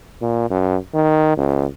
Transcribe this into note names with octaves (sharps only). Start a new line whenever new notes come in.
A#2
F#2
D#3
C#2